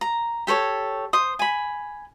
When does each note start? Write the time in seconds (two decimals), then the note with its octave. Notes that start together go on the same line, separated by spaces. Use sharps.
0.01 A#5
0.47 G4 A4 C5 C#5
1.13 C5 D#6
1.39 G#5 B5